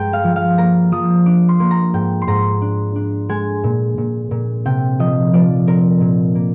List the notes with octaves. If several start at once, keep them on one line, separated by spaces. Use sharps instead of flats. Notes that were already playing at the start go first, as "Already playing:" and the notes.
Already playing: G2 G#3 G5 A#5
F5
F3
F5
A#3 A#5
F3 D#6
D4 D6
C6
A#3
A#5
G#2 G5
C6
G#2 A#5
D4
D4
G#3 G#5
A#2
A#2
A#2
C3 G5
F3 D#5
F3 D5
C4 A#4
A#2
A#3